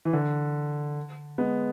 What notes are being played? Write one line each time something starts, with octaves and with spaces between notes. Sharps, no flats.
E3
D3
G#3 B3